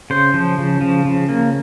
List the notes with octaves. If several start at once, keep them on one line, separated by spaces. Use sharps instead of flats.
C#3 C5
F3
C#3
F3
C#3
A#3